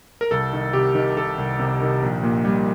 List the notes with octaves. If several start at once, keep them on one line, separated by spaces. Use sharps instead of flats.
A#4
C2 A4
D#3
C3 G4
D#3
D#3 A4
C2
C3
D#3
A#1
A#2
G3